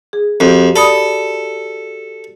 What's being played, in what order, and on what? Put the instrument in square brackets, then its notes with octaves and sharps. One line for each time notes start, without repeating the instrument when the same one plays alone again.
[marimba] G#4
[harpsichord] F2 [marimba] F#4 G4
[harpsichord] A4 [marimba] D5 B5 D#6